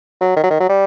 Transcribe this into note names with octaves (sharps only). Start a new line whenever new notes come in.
F#3
D#3
F#3
D#3
F#3
G3